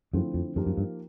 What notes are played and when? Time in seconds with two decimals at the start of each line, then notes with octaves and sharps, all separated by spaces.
0.13 F#2 D3 F3 A3 C4 E4
0.34 F2
0.56 F#2 F3 A#3 D#4 G4 A#4
0.66 F#2
0.78 G2